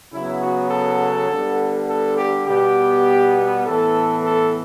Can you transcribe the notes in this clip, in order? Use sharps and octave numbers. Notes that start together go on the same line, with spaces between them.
C#3 F#3 B3 E4
F#4
A4
D3 G3 B3
A4
G4
B2 G3 B3 G4
A2 E3 B3 A4
A4